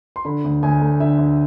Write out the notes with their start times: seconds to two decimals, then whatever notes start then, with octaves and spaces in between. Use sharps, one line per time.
0.16 C6
0.25 D3 B5
0.44 D2
0.63 D2 G#5
0.81 A3
1.00 D3 E5
1.19 D2